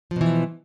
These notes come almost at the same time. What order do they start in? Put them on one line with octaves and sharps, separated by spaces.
F3 B2 E3